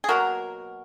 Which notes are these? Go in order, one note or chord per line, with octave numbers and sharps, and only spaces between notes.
G#4
B2 F#3 A#3 F#4 A#4